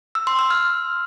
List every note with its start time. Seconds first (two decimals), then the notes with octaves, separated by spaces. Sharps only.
0.15 E6
0.27 C6
0.39 E6
0.50 F6